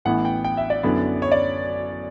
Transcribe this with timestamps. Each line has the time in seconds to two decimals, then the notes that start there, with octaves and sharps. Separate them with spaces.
0.05 A1 A2 E3 B3 E4 F#5
0.25 G5
0.44 G5
0.57 E5
0.70 D5
0.83 F#2 D3 F#3 B3 E4
1.22 C#5
1.32 D5